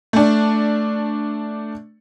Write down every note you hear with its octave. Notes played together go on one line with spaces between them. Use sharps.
A3 D4